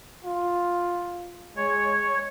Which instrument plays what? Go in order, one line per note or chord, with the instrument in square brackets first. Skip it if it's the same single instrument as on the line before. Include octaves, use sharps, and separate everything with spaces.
[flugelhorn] F4
[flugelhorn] G#3 [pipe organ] C#5